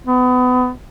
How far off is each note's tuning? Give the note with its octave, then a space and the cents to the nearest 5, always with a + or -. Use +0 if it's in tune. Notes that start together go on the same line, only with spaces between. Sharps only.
B3 +30